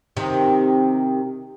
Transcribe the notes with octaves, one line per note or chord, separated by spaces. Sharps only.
C3 D#3